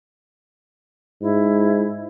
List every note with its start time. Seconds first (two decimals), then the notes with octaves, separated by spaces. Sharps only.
1.22 G#2 E4